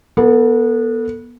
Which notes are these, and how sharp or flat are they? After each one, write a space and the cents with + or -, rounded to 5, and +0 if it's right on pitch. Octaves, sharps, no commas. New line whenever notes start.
B3 -25 A4 +20